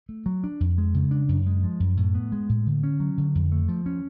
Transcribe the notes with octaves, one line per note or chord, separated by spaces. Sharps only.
A3
F#3
D4
F2
G#3
C#3
D4
F#2
G#3
F3
F#2
A2
B3
G#3
A2
D3
C#4
F#3
D3
F2
A3
F3
C#4